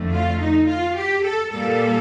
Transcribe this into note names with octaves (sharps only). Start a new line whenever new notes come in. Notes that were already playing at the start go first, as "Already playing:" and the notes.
Already playing: F2 D3 A3
F4
D#4
F4
G4
A4
A#2 G3 A#3 A4